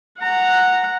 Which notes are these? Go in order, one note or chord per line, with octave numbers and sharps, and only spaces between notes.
F#5 A#5